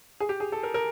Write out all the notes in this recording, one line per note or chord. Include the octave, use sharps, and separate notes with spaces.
G#4
G4
G#4
A4
A#4
A#4